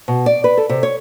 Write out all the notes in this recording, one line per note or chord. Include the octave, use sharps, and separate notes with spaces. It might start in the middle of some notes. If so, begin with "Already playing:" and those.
B2
D5
B4
A4
C3
C#5